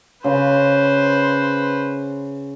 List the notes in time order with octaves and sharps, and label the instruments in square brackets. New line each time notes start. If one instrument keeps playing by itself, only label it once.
[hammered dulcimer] C#3 [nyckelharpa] B4 C5